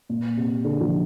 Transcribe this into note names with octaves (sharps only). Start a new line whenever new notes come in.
A#2
C3
D3
F3